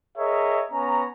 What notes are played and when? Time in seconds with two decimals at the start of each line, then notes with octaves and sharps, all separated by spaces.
0.18 G#4 A#4 C#5 D#5 E5
0.72 B3 C#4 A#5